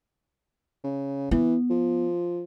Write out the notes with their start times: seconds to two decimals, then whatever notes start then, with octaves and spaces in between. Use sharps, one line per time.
0.84 C#3
1.31 E3 B3
1.70 F3